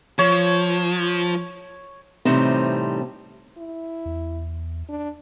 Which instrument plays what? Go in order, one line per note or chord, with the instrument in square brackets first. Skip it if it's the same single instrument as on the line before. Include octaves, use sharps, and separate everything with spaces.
[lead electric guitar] F3 [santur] C#5
[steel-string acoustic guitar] A2 C3 E3 G3 C4 D#4
[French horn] E4
[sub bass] E2
[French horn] D4